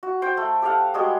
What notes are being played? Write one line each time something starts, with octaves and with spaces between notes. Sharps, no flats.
F#4
C5 G5
A3
G4 A4 F5 F#5
G3 G#3 F#4 G#4